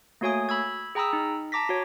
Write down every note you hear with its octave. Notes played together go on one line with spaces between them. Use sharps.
A3 A#3 F#4 C#5 G#5 D#6
B5 E6 G#6
G#4 G5 A#5 B5 D#6 E6
D#4
A5 A#5 D6 A#6 B6
F#4 C#5